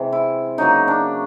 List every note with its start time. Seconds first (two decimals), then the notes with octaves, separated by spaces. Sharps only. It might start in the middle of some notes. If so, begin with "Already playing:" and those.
Already playing: C3 E3 G#3
0.12 E4
0.58 C#3 F#3 A#3 D#4
0.88 D4